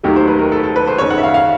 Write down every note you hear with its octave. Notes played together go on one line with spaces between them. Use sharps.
D#2 D#3 F#3 A3 G4
C5
B4
A#4
A4
A4
B4
C5
F#1 F#2 D#3 C#5
F#5
E5
F5
F5